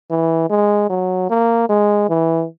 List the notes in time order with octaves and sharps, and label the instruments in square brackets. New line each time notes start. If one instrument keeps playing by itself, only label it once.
[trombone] E3
G#3
F#3
A#3
G#3
E3